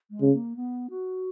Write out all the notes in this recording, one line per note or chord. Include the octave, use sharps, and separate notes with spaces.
G#3
C#3
A#3
B3
F#4